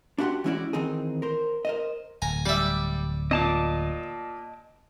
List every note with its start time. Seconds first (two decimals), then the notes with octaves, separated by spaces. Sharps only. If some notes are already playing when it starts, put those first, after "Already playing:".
0.18 D4 E4 F#4 G4 F#5 C6
0.44 E3 G#3 C#4 E4 F#4 D5
0.73 D#3 E3 C4 D#4 G#4
1.22 A#4 C5
1.65 A#4 C5 D#5
2.22 D1 G#5 A#5
2.45 G3 D5 E5
3.31 A#2 D#5 A5 D6